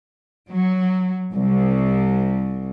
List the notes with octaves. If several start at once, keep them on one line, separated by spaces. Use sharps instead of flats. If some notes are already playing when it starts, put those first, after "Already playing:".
F#3
C2